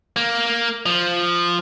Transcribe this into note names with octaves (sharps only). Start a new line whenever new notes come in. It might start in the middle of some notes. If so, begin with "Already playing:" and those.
A#3
F3